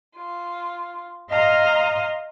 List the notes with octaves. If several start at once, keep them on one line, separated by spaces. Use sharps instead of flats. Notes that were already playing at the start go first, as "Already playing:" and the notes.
F4
D#5 F5 A#5 C6 D#6